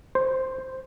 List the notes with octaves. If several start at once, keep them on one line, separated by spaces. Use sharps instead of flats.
C5